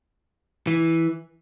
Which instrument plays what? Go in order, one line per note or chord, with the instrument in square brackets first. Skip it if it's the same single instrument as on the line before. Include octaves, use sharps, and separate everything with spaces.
[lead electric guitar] E3